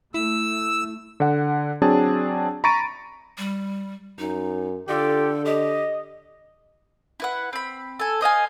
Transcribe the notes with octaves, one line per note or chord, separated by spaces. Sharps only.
A3 E4 E6
D3 F#5
F#3 C4 D4 G#4 A5
A#5 B5 C#6 A6 D7 D#7
G3
F#2 D#4
D3 F4 G4 A4 D5
G4 D#5
E4 B4 F#5
C4 B5
A4 G#5
C5 D#5 F5 G#5